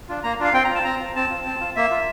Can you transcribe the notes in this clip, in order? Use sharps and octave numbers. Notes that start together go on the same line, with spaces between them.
D4 F4
A#3 A#5
D4 F4 F5
C4 G5
A#5
F4
A5
C4 A#5
F4
C4 A5
F4
C4
F4
A#3 E5
F4